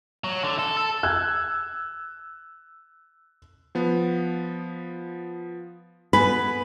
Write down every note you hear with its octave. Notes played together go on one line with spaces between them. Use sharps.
F#3
D3
A4
A4
E6 F#6 G#6
F3 B3
B3 B4 G#5 B6